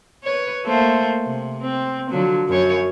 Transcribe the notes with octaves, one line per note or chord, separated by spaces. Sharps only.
B4 C#5
A3 A#3 C5
C3
C4
D3 F3 F#3
F#2 C#5